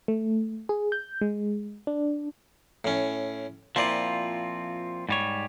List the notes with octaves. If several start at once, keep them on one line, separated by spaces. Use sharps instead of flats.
A3
G#4
G6
G#3
D4
A2 C#4
A#2 F3 C4 E4 F4 D5
G#2 G3 C#5